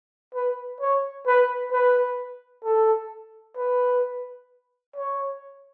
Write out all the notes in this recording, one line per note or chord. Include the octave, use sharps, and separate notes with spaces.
B4
C#5
B4
B4
A4
B4
C#5